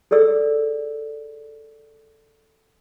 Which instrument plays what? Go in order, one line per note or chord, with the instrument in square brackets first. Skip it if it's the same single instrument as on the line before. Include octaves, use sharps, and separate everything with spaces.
[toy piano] G#4 A4 D5 E6